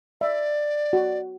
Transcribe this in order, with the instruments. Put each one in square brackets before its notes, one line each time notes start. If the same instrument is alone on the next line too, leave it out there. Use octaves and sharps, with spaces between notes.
[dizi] D5 [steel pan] E5
[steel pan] F#4